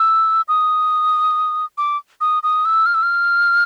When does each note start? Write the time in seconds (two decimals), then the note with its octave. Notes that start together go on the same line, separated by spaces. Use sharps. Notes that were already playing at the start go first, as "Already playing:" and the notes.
Already playing: E6
0.48 D#6
1.78 D6
2.21 D#6
2.43 D#6
2.65 E6
2.86 F6
2.94 E6
3.03 F6